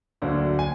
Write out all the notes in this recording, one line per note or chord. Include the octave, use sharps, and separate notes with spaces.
D2 D3 F#3 A#3 D4
G#5